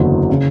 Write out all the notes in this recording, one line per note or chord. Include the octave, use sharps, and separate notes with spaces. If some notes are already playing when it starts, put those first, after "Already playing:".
Already playing: F#1 E2 D3 F#3
C#3